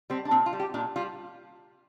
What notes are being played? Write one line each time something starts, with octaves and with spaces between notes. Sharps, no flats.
G3 C4
D4
A#2 C4
F4
G3
G4
A#2 D4
G3 F4